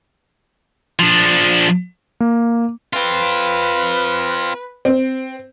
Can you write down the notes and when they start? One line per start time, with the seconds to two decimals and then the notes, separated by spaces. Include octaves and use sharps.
0.99 F3 D4
2.20 A#3
2.93 C4 F4 B4
4.85 C4